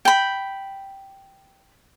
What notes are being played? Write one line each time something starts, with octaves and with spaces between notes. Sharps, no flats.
G5 B5